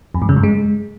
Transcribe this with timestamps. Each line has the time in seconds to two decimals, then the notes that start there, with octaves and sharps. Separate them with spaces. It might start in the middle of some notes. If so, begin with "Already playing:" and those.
0.14 F2
0.22 G#2
0.29 C#3
0.36 G2
0.43 G#3